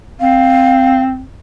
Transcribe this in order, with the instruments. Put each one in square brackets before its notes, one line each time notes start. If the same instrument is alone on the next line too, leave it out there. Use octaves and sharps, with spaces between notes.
[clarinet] C4 [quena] F5